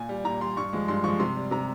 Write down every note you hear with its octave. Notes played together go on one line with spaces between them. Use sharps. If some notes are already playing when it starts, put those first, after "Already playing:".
Already playing: A#2 G#5
G3
A#2 A#5
G3 C6
G2 C#6
F3 G#3
G2 C6
F3 G#3 C#6
C3 C6
G3
C3 A#5